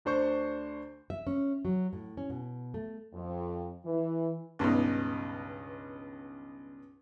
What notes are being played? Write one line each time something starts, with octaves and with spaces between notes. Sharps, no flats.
D2 D4 C5 C#6 G6
E5
C#4
F#3
A2
C#4
B2
A3
F2
E3
C#2 G2 B2 D#4